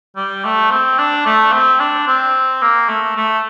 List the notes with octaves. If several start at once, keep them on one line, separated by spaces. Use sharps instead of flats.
G3
A3
C4
D4
A3
C4
D4
C4
A#3
A3
A3